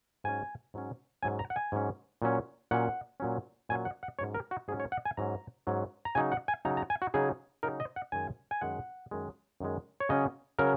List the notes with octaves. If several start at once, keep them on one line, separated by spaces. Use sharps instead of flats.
G#2 F#3 C#4 G#5
G#2 F#3 C#4
G#2 F#3 C#4 G#5
A#5
F#5
G#5
G#2 F#3 C#4
A#2 F#3 C#4
A#2 F#3 C#4 F#5
A#2 F#3 C#4
A#2 F#3 C#4 G#5
F#5
F#5
G#2 F#3 C#4 C#5
A#4
F#4
G#2 F#3 C#4 G#4
C#5
F#5
G#5
G#2 F#3 C#4 A#5
G#2 F#3 C#4
A#5
C#3 F#3 D#4 G#5
F#5
G#5
C#3 F#3 D#4 A#5
A#5
G#5
F#4
C#3 F#3 D#4 G#4
C#3 F#3 D#4 A#4
D#5
F#5
F#2 D#3 G#3 G#5
G#5
F#2 D#3 G#3 F#5
F#2 D#3 G#3
F#2 D#3 G#3
C#5
C#3 F#3 C#4 D#5
C#3 F#3 C#4 A#4